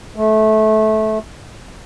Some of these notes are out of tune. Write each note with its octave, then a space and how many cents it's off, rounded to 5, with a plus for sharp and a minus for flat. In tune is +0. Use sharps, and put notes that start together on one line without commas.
A3 -20